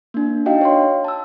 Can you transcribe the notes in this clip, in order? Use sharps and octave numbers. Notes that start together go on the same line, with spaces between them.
A#3 D4
D4 D#4 F#4 D#5 F5 G5
C#5 F5 C6
A5 E6